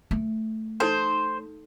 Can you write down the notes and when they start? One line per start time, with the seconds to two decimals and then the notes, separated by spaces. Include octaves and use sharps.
0.11 A3
0.80 D#4 A4 C5 C6